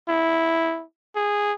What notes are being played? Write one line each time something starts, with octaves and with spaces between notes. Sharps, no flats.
E4
G#4